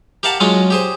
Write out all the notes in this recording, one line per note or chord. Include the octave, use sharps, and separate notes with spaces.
G4 A#4 F5 F#5 A5
F#3 G#3 C#4 F4
G4 G#4 C5